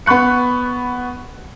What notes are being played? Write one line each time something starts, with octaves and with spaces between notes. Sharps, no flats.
B3 B5 C#6 F#6 C#7